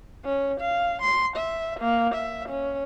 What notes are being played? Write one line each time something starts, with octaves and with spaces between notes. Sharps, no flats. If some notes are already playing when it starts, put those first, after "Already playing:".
C#4
F5
C6
E5
A#3
E5
C#4